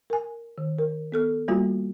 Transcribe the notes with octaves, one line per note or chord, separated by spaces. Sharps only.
A#4 G#5
D#3
A#4
B3 A4 F6
G3 A#3 F4 F#4